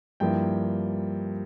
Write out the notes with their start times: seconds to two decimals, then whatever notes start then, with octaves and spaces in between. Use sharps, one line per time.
0.20 G2 F3 A#3 E4 G5